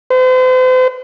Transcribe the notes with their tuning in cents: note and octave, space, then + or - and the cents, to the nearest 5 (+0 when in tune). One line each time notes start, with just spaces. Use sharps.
C5 -40